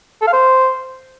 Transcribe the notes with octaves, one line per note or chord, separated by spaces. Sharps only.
A4
F5
C5